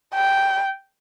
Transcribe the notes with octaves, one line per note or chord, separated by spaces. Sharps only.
G5